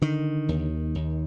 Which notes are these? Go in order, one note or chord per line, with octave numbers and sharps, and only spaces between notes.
D3 D#3
D#2
D#2